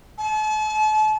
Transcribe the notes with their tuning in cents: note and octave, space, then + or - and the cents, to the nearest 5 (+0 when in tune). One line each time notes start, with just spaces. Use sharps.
A5 -40